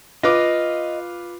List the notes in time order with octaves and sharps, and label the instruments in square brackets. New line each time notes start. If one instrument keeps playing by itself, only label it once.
[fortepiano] F4 B4 D6 [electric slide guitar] D#5